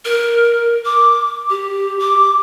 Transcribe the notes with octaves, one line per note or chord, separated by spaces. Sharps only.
A#4
D6
G4
D6